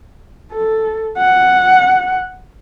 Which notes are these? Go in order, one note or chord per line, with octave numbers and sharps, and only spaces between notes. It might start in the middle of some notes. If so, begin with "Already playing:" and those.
A4
F#5